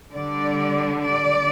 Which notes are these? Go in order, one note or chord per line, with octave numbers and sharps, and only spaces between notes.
D3 G3 D5
D5